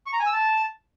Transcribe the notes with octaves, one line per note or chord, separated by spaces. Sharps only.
C#6
A#5
G#5
E6
A5